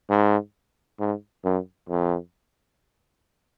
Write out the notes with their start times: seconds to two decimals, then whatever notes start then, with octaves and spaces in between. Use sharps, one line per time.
0.10 G#2
1.00 G#2
1.44 F#2
1.89 F2